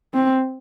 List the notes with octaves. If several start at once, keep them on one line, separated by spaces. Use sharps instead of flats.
C4